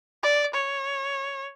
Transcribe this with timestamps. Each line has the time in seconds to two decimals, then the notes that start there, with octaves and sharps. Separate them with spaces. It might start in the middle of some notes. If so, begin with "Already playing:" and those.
0.23 D5
0.54 C#5